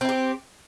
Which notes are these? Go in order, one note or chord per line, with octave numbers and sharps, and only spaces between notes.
C4 E4 G4